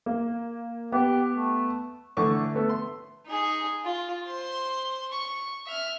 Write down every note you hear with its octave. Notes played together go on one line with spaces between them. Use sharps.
A#3
B3 G4
A3
D3 E3 A3 C#6 D6
A3 B3 A4
C6
D#4 G#4
F4
C5 C6
C#6
E5 F6